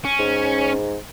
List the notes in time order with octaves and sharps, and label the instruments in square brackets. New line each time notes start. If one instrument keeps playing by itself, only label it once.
[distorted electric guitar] C#4
[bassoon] G#2